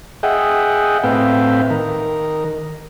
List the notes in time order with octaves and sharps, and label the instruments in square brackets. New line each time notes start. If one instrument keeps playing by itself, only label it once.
[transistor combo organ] G#4 D#5 E5 F#5 G5
A2 C4 B4 E5 F5 G5
D#3 A#4